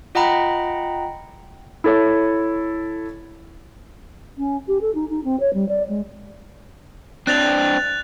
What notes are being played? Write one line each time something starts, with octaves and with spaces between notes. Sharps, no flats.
F4 D#5 F#5 G5 A#5 B5
E4 A4 C#5
C#4
G4
A4
D#4
D#4
C4
C#5
G3
D5
G#3
C4 D4 F#6 A6 F7